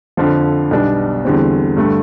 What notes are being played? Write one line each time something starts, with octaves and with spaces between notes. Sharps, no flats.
F2 D3 F3
B1 B2 G3 D4
E2 D3 G3 C4
G2 D3 A3